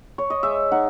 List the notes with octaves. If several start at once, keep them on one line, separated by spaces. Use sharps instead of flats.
C#5
D#5
G#3 E5
D#4 F#5